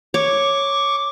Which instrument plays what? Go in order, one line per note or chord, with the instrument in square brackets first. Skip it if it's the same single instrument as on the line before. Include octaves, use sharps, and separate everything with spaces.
[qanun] C#5 [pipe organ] C#6 D6